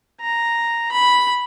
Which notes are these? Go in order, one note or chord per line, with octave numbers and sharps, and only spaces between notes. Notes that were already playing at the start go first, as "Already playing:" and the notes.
A#5
B5